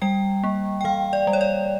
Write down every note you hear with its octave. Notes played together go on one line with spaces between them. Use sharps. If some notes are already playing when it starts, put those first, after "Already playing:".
G3 G5
A#3
G5
E3 F5
D5
G3
C#5
D5